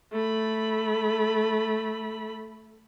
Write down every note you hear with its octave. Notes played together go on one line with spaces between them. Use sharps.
A3 B5